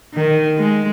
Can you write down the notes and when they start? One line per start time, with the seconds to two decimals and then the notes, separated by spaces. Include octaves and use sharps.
0.14 D#3
0.58 G#3